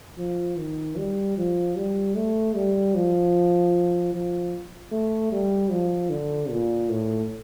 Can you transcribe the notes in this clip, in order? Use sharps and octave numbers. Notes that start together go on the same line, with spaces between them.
F3
D#3
G3
F3
G3
A3
G3
F3
F3
A3
G3
F3
D3
A#2
A2